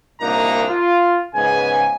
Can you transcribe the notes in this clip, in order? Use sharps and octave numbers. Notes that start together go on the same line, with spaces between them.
C2 A#2 A#3 D4 D#4 A#5
F4
G#2 C#3 B3 G#5